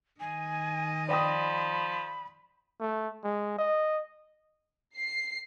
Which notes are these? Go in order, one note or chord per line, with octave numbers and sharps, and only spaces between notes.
D#3 D#5 G#5
F3 D5 G5 B5 D#6
A3
G#3
D#5
C7